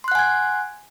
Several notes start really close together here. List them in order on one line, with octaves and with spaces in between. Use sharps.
C6 F#6 F#5 G#5 G#6